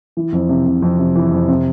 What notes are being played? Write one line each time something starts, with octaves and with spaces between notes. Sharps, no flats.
E3
F2
C3
C3
F2
C3
E3
F2
C3